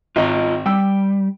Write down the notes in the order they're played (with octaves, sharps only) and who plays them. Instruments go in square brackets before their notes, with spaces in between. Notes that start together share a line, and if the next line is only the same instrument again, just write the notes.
[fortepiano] G#1 D#4 [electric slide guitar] F4 D#5
[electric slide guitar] G3 [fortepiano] G5 E6